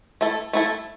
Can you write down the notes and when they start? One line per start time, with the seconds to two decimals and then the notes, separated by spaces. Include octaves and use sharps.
0.21 A3 E4 A4
0.53 A3 E4 A4